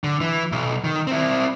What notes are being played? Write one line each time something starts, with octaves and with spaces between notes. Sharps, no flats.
D3
E3
B1
D#3
C4 E4